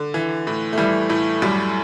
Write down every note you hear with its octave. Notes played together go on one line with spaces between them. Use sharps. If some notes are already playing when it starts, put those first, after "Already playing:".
Already playing: D3
E3
A2
A3
E3 G3
A2 A3
F#2 G3